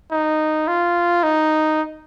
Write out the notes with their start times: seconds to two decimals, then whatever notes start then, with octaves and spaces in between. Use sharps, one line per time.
0.12 D#4
0.68 F4
1.24 D#4